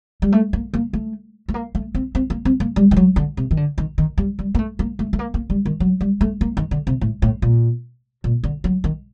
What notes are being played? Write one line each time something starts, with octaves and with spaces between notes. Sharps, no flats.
G3
A3
A#3
A#3
A3
A3
A#3
A3
C4
C4
A#3
C4
A#3
G3
D#3
F#3
D3
C3
D#3
D3
D#3
D#3
G3
G3
A#3
A3
A#3
A3
A3
A#3
A#3
G3
D#3
F#3
G3
A3
A#3
D#3
D3
C3
A2
A2
A#2
A#2
D3
F#3
D#3